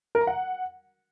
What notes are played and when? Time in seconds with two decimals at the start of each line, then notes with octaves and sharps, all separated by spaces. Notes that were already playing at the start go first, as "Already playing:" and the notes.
0.15 A#4
0.21 A#5
0.27 F#5